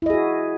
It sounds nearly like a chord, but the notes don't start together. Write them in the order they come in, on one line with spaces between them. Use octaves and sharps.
E4 D#5 G#4 F#4